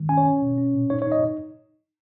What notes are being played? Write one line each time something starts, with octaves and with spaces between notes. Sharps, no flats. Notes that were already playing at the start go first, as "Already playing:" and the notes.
Already playing: D#3 G#3
C#4 G#5
C#5
C#4
B2
C#4
A#2
D#4 C#5
C#5
D#4 D#5